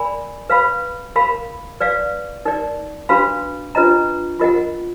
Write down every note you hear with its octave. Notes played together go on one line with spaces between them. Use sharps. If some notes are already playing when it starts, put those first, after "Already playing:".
Already playing: A#4 D5 G#5 B5
B4 F5 B5
A#4 F5 B5
B4 D5 F5
D#4 A#4 D5
D4 F#4 B4 F5 B5
D4 F4 B4 D#5 A#5
F4 A#4 D#5 F#5